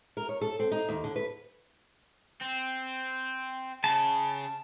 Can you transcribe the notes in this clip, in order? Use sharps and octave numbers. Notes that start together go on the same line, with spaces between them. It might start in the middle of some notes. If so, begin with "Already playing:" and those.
A#4
C#5
A4
C4
D#4
D#2
D3
B4
C4
C#3 A5